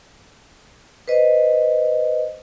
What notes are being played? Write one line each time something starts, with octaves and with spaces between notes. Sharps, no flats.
B4 C5 D#5